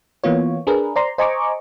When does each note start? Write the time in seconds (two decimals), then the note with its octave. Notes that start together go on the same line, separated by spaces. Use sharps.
0.24 E3 A#3 B3 F4 C#5
0.67 D4 G#4 A#4 B4
0.96 C5 D5 A#5 C6
1.18 C5 D#5 G#5 A#5 C#6 D6